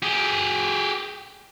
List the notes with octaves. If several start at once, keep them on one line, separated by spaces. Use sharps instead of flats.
G4 G#4